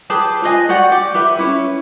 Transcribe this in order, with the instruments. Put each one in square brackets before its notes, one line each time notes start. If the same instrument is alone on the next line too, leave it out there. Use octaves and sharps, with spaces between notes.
[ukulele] G4 G#4 B4 A5
F4 B4 D#5 G#5
F#4 G4 D5 F#5
G4
G4 B4 E5
C#4 E4 B4